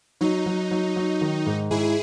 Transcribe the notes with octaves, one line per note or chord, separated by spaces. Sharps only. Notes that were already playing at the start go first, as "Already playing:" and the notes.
F#3 D#4
F#3
F#3
F#3
D#3
G#2
G#2 E4 G#4